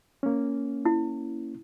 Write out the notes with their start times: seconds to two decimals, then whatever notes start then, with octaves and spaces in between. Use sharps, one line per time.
0.23 A#3 C#4
0.85 E4